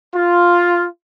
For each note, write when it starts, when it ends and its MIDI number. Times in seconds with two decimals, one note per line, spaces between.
0.14 0.85 65